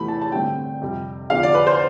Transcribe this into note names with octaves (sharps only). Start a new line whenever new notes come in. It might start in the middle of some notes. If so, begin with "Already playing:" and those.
Already playing: E2 C3 E3 A3 B5
A5
A5
G2 D3 A3 C4 G5
F2 C3 G3
E2 D3 F3 F5
D5
B4
C5